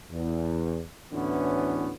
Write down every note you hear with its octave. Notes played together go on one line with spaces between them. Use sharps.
E2
D2 A2 D3 E3 B3 C#4